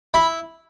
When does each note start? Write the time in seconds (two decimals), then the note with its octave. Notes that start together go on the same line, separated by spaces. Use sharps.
0.14 E4 B5